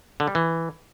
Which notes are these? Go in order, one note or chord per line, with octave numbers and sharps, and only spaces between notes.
D3
G3
E3